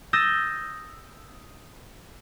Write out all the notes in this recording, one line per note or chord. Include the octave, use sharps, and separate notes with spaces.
D#6 E6 G6 A6 A#6